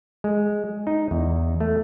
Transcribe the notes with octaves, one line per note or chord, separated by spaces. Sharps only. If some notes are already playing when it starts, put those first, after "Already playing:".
G#3
D#4
E2
A3